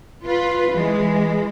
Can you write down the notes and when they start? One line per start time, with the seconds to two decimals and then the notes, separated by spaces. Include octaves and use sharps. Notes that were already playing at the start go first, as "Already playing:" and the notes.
0.25 F4 B4
0.71 E3 G#3